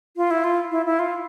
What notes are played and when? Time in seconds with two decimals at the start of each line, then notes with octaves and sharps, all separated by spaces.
0.17 F4
0.31 E4
0.44 F4
0.71 E4
0.86 E4
0.99 F4